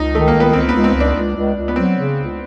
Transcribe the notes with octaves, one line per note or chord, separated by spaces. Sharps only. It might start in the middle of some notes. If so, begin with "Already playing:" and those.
Already playing: C#2 D#4
D#3 A3
A#3
C#2
B3
C#2 C4
C#2 B3
C4
C#2
D4
C#2
C#2
C#2
B3
F#3 C4
C#3
C#2